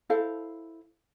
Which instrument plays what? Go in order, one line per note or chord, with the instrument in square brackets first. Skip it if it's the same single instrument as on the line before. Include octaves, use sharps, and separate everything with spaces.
[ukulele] E4 A4 C5 F5